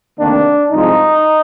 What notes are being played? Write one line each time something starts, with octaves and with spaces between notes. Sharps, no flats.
D2 C3 D#3 A#3 D4
C2 C3 F3 G#3 D#4